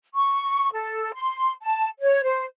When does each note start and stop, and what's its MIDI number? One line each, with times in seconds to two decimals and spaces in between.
0.15 0.69 85
0.73 1.11 69
1.14 1.52 84
1.63 1.88 81
2.00 2.21 73
2.23 2.46 72